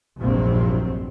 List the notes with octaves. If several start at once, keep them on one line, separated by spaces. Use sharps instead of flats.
F1 A#1 G2 C3 F#3 C4